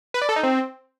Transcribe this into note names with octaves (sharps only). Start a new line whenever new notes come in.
B4
D5
A4
D#4
C4